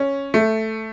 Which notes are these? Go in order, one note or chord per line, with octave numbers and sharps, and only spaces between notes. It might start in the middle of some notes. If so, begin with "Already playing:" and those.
Already playing: C#4
A3